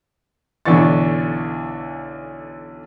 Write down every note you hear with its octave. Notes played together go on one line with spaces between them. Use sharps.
B1 D3 E3 D4 C#6 A6